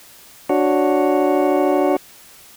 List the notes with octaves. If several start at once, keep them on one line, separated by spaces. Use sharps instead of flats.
D4 F#4 C#5